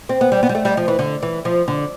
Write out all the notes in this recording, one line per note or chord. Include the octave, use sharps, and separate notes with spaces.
C4
B3
G3
B3
G3
A3
G3
F3
E3
D3
E3
F3
D3